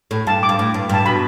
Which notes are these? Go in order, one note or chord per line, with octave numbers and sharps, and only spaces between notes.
A2
G2 A5
D6
G2
A2
G2
G2 A5
B2 B5